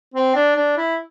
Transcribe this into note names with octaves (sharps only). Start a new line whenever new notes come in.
C4
D4
D4
E4